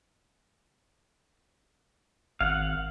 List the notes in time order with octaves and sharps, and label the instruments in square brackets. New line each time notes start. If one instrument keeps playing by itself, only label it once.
[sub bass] G#1 [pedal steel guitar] F5 F#5